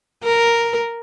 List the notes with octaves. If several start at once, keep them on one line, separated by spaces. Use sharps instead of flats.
A#4